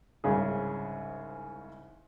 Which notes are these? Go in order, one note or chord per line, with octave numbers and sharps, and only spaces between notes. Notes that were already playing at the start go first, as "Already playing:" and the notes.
C2 G#2 C#3 G#4